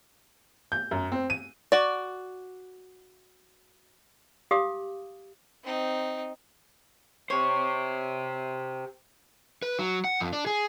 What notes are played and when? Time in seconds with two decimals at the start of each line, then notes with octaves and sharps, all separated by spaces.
0.72 G6
0.91 F#2
1.12 C4
1.30 D#7
1.72 F#4 D5
4.51 G4 F5 D6 D#6
5.63 C4 D#4
7.30 G4 C5 C#5
9.62 B4
9.79 F#3
10.04 F#5
10.20 F2
10.33 D4
10.47 G#4